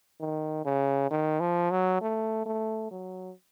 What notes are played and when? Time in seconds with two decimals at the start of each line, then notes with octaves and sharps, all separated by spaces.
0.20 D#3
0.65 C#3
1.11 D#3
1.40 F3
1.70 F#3
2.01 A3
2.46 A3
2.91 F#3